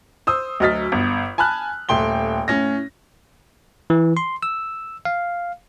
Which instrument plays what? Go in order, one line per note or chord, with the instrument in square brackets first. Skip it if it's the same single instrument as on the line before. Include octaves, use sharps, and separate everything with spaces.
[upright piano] C5 D#6 E6
D2 F#3 D#5 F6 A6 B6
G1
G#5 A5 B5 F6 F#6
D#1 A3 G5 C6 G7
A2 C#4 A#6
[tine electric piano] E3
C6
E6
F5